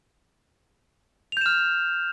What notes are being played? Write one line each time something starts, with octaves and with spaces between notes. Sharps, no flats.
F6 G6 E7 F7